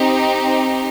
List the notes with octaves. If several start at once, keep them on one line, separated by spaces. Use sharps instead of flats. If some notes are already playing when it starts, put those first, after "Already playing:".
Already playing: C4 D#4 G4